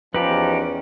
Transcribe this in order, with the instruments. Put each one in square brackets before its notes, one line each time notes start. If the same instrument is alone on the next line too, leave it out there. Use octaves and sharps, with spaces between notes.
[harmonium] E2 C#4 [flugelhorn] F3 [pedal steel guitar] D#4 G4 [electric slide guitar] B4